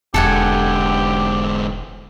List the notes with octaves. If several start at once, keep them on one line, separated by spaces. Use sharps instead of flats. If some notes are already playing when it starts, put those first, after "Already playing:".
E1 G#2 D3 G4 A4 F#5 G#5